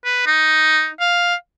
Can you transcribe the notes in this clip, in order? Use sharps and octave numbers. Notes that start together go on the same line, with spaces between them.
B4
D#4
F5